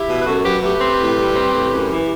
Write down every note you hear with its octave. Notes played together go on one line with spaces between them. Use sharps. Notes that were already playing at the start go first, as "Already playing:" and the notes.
Already playing: E4 G4
B2
B4
F#2 F#4 A4
F#3 G4 B4
A3 G4 B4
C4
A2
G3
C4
A2
F#2
E3